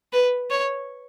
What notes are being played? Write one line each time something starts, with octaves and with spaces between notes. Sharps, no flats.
B4
C#5